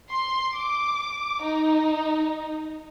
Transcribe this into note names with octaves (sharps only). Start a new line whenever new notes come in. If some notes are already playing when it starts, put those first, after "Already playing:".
C6
D6
D#4